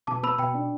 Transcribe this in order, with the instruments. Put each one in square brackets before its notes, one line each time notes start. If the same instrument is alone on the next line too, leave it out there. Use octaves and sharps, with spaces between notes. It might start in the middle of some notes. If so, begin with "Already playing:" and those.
[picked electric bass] B2 [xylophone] A5 D6
[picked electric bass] B3 [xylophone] B5 E6
[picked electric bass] B2 [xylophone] G5 B5
[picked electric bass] D4